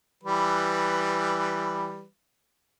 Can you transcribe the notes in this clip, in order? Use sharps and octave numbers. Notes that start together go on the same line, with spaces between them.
E3 G3 B4